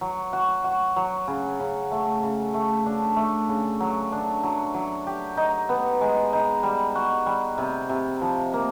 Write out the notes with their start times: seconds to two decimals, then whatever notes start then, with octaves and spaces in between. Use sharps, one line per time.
0.01 F#3
0.33 F#4
0.64 F#4
0.96 F#3
1.28 C#3
1.60 C#3
1.91 A3
2.23 C#3
2.54 A3
2.86 D4
3.16 A3
3.49 C#3
3.80 F#3
4.12 D4
4.43 F#3
4.74 F#3
5.07 G4
5.37 D#4
5.69 B3
6.01 G#3
6.33 D#4
6.63 G3
6.95 F#4
7.26 G3
7.58 C3
7.89 C3
8.21 F3
8.53 A#3